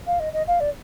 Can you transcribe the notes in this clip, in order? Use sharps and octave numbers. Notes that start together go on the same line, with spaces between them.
F5
D#5
D#5
F5
D5